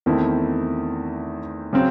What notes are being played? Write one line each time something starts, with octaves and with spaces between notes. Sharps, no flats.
E2 D#3 A3 C4 E4
C#3 F#3 C4